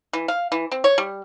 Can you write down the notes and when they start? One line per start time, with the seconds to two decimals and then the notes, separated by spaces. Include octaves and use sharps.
0.13 E3
0.28 F5
0.52 E3
0.72 C4
0.84 C#5
0.98 G3